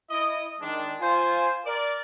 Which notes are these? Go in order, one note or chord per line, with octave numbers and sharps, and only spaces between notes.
E4 D#5
D#3 G#3 D4
F4 C5 G#5
A#4 D5